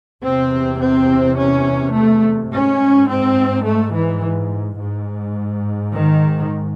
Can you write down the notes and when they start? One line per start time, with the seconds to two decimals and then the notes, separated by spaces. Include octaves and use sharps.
0.23 E2 C3 C4
0.81 C4
1.37 C#4
1.94 A3
2.51 G#2 C#4
3.08 C4
3.64 A3
3.93 E3
4.78 G#2
5.91 D#3